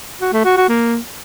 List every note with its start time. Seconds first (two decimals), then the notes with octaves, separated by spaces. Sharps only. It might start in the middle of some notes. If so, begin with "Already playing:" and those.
0.21 F#4
0.33 A3
0.45 F#4
0.57 F#4
0.69 A#3